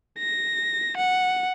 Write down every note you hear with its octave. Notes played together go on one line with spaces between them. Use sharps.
A#6
F#5